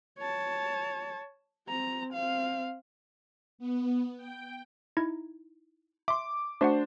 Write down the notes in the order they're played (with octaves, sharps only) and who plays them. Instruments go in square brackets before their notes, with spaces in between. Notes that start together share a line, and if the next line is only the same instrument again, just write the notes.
[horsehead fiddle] C#5 A5
C4 A#5
C4 F5
[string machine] B3
G5
[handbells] D#4 E4 G#6
[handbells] E5 C6 [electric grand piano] D6
[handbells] A3 F#4 F#5 [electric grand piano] D4 C5